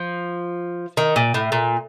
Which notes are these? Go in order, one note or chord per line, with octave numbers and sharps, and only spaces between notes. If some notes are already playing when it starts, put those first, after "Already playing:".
Already playing: F3
D#3
A#2
A2
A#2